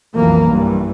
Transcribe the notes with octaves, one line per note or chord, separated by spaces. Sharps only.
B1 F2 E3 A#3
G2 E3